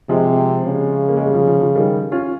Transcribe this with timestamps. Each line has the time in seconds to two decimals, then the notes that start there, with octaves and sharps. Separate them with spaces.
0.09 C3 F3 G#3
0.64 C#3
1.08 A#3
1.17 G#3
1.26 G3
1.34 F3
1.47 F3
1.61 F3
1.75 D#3 G3
2.12 C#4 F4